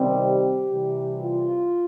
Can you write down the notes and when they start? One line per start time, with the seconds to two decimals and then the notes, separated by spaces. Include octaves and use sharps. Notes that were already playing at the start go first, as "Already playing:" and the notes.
Already playing: C3 D#3 G3 C4
0.18 G4
0.68 C3 E3 G3
1.19 F4